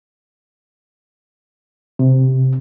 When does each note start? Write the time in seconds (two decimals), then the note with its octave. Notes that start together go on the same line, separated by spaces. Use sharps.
1.99 C3